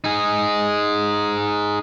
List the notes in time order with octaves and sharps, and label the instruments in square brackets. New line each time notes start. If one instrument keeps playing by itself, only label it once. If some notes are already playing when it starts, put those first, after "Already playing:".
[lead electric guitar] D#4 G#4